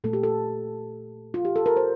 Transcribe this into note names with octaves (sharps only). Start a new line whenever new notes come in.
A#2 A3 A4
G4
A4
F4
G4
A4
A#4
C5